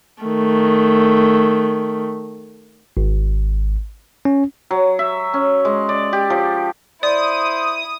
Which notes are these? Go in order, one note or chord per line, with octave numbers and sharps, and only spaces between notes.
D#3 A3
G#1
C#4
F#3
E5
C#4
G#3
D5
G4
F3
E4 C5 D5 D#6